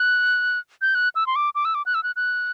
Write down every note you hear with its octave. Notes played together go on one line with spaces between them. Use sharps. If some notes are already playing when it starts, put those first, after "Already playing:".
Already playing: F#6
G6
F#6
E6
C6
D6
D6
E6
D6
F#6
E6
F#6
F#6